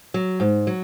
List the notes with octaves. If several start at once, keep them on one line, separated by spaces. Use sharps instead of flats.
F#3
G#2
F#3